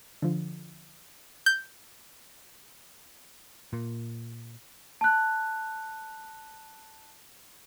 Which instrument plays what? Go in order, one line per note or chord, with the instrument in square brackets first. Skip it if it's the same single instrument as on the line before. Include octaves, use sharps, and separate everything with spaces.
[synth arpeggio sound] D3 F3
[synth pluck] G6
[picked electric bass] A#2
[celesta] A5 F#6